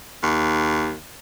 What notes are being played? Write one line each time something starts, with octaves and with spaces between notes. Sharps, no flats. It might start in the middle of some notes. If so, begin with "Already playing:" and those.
D#2